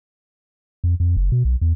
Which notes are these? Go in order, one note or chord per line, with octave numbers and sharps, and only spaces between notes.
F2
F2
F#1
B2
B1
E2